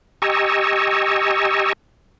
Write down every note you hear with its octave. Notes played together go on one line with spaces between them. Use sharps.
G4 D#5 G#5 A#5 C#6 E6